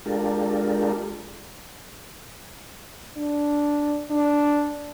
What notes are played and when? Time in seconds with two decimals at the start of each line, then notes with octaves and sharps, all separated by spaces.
0.05 G#3 D4 F4 G4 A4 A#4
3.17 D4
4.10 D4